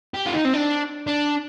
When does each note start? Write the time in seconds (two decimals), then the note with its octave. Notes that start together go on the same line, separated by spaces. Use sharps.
0.14 G4
0.26 F4
0.34 D#4
0.45 C4
0.54 D4
1.07 D4